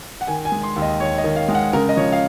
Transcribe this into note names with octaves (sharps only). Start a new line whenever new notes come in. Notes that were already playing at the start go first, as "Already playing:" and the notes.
F#5
D#3 G#5
G#5
G#3
C6
D#2
D#5
D#2 C#5
D#5
D#3
F5
G#3 F5
F#5
C#3 A#4
D#5
F3 C#5
F5